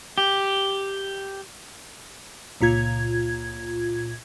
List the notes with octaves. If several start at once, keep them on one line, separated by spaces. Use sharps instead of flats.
G4
C#2 A#2 F4 G#6